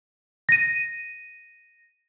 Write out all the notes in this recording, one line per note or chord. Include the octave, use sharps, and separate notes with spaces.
A#6 D#7